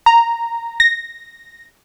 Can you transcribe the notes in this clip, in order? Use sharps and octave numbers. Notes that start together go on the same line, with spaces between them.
A#5
A#6